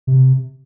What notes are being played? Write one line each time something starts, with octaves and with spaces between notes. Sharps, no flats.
C3